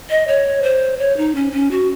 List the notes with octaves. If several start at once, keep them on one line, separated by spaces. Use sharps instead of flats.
D#5
C#5
C5
C#5
D#4
C#4
C#4
F#4